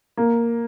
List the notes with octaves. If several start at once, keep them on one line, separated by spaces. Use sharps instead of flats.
A#3